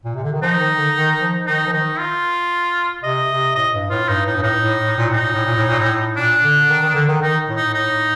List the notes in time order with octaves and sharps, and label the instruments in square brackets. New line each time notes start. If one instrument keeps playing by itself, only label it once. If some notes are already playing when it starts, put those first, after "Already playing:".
[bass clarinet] A#2
C3
D3
D#3
[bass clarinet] F3 [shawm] D#4
[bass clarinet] D#3
D3
D#3
F3
[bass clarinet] D#3 [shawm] D#4
[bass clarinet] F3
[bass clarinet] D#3 [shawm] D#4
[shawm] F4
[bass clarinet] C3 [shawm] D#5
[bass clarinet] C3
[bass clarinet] A2 [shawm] D#5
[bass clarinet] G2
[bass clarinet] A2 [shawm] F4
[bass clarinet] G2 [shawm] D#4
[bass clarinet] A2 [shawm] D#4
[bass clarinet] G2
[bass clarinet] A2 [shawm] D#4
[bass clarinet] A2
A2
A#2
[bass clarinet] A2 [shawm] D#4
[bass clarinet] A#2
A2
A#2
A2
A#2
A2
[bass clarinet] A#2 [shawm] D4
[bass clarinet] D3
D#3
D#3
D3
D#3
[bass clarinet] D#3 [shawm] D#4
[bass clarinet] A2
[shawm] D#4
[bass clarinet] A2 [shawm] D#4